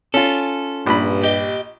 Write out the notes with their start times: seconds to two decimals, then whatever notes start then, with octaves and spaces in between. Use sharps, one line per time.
0.14 C#4 F4 A4
0.86 A#1 G2 B5
1.23 G4 D#5